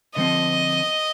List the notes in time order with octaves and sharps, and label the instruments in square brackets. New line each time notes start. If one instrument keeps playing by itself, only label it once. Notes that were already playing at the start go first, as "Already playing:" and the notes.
[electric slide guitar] D3 F3 C4 [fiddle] D#5